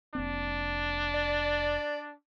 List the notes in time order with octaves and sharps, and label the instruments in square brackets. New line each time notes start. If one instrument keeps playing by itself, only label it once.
[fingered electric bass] F1 A#3 C4 [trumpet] D4
[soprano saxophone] D5